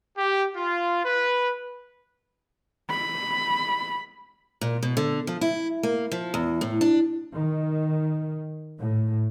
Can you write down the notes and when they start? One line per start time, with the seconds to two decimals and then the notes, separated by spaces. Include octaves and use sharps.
0.16 G4
0.56 F4
1.04 B4
2.90 B5
4.61 A#2
4.83 B2
4.97 D3
5.27 F3
5.41 E4
5.83 A#3
6.12 F3
6.34 E2
6.61 A2
6.81 D4
7.34 D#3
8.79 A2